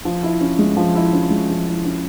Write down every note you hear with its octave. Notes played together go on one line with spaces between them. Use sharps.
F3
E4
C#4
G#3
F3
E4
C#4
G#3
F3
E4
C#4